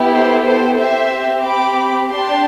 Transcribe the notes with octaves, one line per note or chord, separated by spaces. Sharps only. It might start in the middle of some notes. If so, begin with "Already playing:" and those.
Already playing: B3 E4 G4
A4 C5
A4 C5
C4 G4 C5 E5
B5 D6
D4 G4 A5 C6